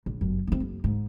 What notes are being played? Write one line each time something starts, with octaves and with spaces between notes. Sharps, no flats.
A#1
G1 F#2
B3 C4
F#1
G#2